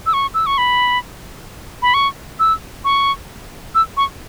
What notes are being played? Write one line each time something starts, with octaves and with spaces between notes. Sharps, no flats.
E6
C#6
E6
C#6
B5
B5
C#6
E6
C#6
E6
C#6